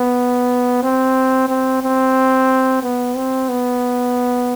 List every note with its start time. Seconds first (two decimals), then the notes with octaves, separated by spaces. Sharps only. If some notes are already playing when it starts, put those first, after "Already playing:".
Already playing: B3
0.83 C4
1.49 C4
1.83 C4
2.83 B3
3.16 C4
3.49 B3